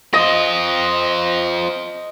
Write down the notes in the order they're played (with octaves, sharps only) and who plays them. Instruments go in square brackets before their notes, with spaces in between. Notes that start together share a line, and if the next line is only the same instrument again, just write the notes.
[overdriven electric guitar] C4 F4 [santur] D#5 D#6